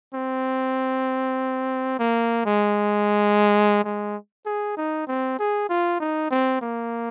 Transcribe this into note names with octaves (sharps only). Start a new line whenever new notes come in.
C4
A#3
G#3
G#3
G#4
D#4
C4
G#4
F4
D#4
C4
A#3